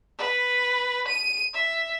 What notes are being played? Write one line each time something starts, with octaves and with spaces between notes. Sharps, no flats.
B4
D#7
E5